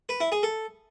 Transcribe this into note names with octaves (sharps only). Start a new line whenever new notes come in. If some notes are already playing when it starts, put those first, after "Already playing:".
B4
E4
G#4
A4